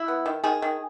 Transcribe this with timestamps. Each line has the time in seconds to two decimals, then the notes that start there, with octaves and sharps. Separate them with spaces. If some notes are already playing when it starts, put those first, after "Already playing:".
Already playing: E4
0.08 B3
0.26 D#3
0.44 D#3 G#4
0.62 D#3